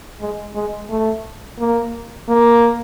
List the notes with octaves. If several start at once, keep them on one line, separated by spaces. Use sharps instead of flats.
G#3
G#3
A3
A#3
A#3